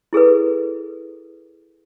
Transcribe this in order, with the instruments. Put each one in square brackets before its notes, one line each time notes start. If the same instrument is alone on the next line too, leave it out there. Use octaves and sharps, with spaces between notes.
[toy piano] E4 G#4 A4 B4